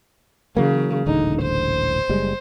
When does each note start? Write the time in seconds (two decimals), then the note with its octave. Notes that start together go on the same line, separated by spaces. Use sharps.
0.57 C#3 E3 F#3 A#3
1.06 D#1 A1 D3 D#4
1.42 C5
2.09 F#1 G3 G#3